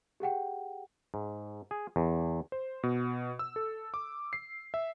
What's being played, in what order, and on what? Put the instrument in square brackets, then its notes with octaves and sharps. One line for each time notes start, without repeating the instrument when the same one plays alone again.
[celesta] G4 G#4 F#5 G5
[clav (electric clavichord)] G#2
G#4
E2
[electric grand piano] C5
B2
E6
A4
D6
C7
E5